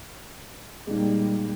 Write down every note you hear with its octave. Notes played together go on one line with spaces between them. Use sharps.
A#2 G3 G#3 A#3 D#4